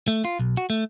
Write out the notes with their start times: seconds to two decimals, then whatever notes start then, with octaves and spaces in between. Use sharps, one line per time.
0.08 A3
0.25 F4
0.39 B1
0.57 F#4
0.70 A3